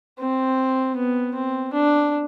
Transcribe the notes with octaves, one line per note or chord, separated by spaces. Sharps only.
C4
B3
C4
D4